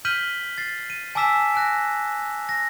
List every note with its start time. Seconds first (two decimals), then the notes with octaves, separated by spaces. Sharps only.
0.05 F6 G6 B6 D#7 F#7 G7
0.58 A6 C7
0.90 D#7
1.15 G#5 A5 D6 E6 B6 E7
1.55 G#5 F#6 A#6
2.49 A#6